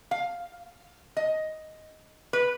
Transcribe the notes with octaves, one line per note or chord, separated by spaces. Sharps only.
F5
D#5
B4